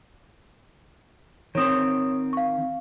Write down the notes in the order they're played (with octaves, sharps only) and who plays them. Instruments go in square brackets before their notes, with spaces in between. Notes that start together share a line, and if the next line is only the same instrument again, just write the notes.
[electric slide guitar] D#3 C4 [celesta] C#5 D#6
[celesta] F5 C#6